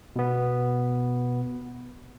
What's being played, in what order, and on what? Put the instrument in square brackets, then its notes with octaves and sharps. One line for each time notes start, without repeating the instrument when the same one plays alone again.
[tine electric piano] B2 B3